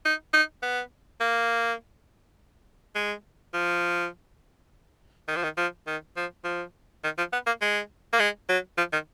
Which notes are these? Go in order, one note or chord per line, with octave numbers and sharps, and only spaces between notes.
D#4
D#4
B3
A#3
G#3
F3
D#3
F3
D#3
F3
D#3
F3
F3
D#3
F3
B3
A#3
G#3
A#3
G#3
F#3
F3
D#3